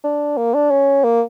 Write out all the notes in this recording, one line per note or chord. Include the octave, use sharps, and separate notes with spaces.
D4
A#3
D4
C#4
A#3